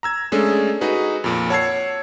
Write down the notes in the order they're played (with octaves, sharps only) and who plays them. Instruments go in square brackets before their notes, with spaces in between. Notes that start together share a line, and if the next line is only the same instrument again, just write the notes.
[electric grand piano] A#5 E6 G#6
G#3 A3 C#4 D4 G#4 A4
D#4 F#4 G#4 B4
F2 A#2
C#5 F#5 A5 E6 G#6 C7